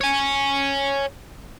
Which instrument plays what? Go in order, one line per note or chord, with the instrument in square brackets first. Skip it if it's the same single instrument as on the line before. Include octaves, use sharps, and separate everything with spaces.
[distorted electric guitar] C#5 G#5